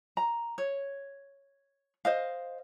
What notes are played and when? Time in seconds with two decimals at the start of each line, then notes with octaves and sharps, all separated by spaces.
0.17 A#5
0.58 C#5
2.05 C5 D#5 F5